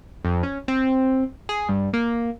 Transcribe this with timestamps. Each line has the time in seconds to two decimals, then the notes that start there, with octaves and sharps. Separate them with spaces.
0.25 F2
0.43 C#4
0.68 C4
1.49 G#4
1.69 G2
1.93 A#3